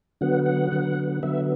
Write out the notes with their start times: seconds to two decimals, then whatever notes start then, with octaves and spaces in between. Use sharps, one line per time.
0.21 D3 F#3 B3 F#5
0.46 F#5
0.72 D3 F#3 B3
1.23 D3 F#3 B3 E5